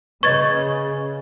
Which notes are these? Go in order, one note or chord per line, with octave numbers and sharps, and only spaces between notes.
C#3 B4 C#5 D#5 C#6 G#6 A6